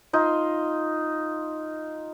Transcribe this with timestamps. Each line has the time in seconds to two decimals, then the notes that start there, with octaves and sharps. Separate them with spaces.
0.13 D#4 F4